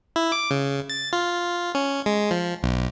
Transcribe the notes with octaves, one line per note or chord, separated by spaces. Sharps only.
E4
D6
C#3
A6
F4
C#4
G#3
F3
B1